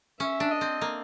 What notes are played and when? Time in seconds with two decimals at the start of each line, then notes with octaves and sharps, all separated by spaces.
0.20 C#4 E5
0.40 D4
0.51 D#5
0.61 C4
0.81 A#3